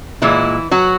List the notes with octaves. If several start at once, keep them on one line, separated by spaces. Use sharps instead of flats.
A#2 E3 G#3 E4
F#3 F#4